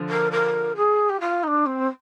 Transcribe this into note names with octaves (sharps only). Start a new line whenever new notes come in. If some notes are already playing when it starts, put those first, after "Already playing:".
Already playing: D3 F3
A#4
A#4
G#4
G4
F4
D#4
D4
C4